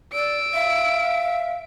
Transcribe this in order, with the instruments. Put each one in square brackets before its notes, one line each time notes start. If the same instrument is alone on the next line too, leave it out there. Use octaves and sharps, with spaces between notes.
[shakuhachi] D5 [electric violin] E6 D7
[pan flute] E5 [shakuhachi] F5